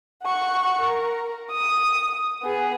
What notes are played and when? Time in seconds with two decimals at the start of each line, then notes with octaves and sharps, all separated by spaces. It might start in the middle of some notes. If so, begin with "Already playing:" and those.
0.24 F#5 C#6
0.81 A#4
1.51 D#6
2.43 B3 G#4